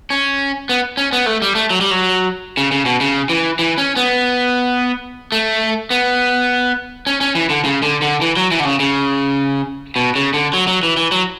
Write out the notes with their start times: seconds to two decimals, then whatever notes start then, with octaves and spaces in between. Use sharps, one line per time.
0.10 C#4
0.69 B3
0.97 C#4
1.13 B3
1.26 A3
1.42 G3
1.55 A3
1.70 F#3
1.81 G3
1.91 F#3
2.57 C#3
2.72 C#3
2.86 B2
3.01 C#3
3.29 E3
3.59 E3
3.78 C#4
3.96 B3
5.32 A3
5.90 B3
7.07 C#4
7.21 C#4
7.35 E3
7.50 D3
7.64 C#3
7.83 D3
8.02 D3
8.21 E3
8.36 F#3
8.51 E3
8.60 D3
8.65 C#3
8.80 C#3
9.96 B2
10.15 C#3
10.34 D3
10.53 F#3
10.68 F#3
10.83 E3
10.97 E3
11.12 F#3